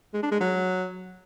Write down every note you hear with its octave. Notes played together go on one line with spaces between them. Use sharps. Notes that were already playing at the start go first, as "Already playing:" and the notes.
G#3
D4
G#3
F#3